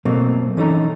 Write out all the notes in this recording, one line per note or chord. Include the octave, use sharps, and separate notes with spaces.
B2 F#3 A3 A#3 C4
E3 C#4 D#4 A4 A#5